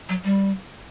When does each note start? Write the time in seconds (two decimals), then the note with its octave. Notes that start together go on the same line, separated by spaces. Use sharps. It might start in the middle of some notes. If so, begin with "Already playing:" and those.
0.09 F#3
0.24 G3